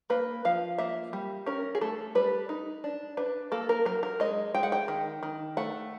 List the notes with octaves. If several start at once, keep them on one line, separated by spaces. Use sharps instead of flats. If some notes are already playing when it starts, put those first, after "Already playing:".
A#3 B4
F3 F5
A#3 E5
G3
C#4 A#4
G#4
A3 A4
G3 B4
D#4
D4
D4 B4
A#3 A4
A#4
F#3 A#4
A#4
G#3 D#5
G#3 G5
F#5
G5
D#3
D#3
A3 F#5